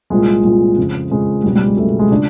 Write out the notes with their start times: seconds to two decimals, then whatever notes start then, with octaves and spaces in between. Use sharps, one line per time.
0.10 C2 A#2 F3 G#3
0.44 C2 A#2 F3
0.77 F2 C#3 F3
1.10 F2 C#3 F3 G#3
1.44 C#2 B2 F#3 G3
1.55 G3
1.66 G#3
1.77 C#2 B2 F#3 A3
1.99 G#3
2.11 C#3 F3 D4